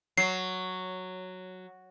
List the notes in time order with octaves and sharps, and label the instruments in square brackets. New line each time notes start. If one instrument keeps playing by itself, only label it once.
[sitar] F#3 [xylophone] C7